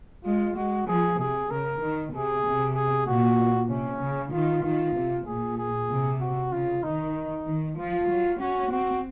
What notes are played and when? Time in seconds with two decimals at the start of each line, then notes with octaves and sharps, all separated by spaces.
0.24 G#3 F4
0.56 G#3 F#4
0.88 F3 G#4
1.19 C3 G#4
1.51 C#3 A#4
1.81 D#3
2.13 C3 G#4
2.45 C3
2.75 G#4
3.07 A#2 F#4
3.69 C3 C#4
4.01 C#3
4.33 D#3 F4
4.64 D#3 F4
4.95 C3
5.27 A#2 G#4
5.58 G#4
5.89 C3
6.21 F#4
6.52 C#3 F4
6.83 D#3 D#4
7.46 D#3
7.78 F3 F4
8.09 F#3
8.40 C#4 F#4
8.71 C4 F#4